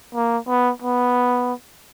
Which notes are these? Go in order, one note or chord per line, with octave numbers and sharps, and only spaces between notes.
A#3
B3
B3